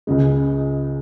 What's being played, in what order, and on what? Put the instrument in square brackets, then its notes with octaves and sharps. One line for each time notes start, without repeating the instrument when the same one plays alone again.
[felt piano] C#2 C#3 G#3